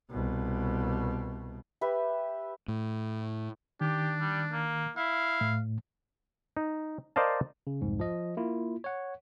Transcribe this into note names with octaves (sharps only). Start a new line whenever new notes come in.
C2 B2
G4 B4 E5
A2
D#3 D4 G4
G3
A#3
E4 F5
A2
D#4
A#4 C5 D5 D#5 F5 A5
C#3
C2 F2 G#2
F3 D#5
A#3 E4 F4
C#5 F#5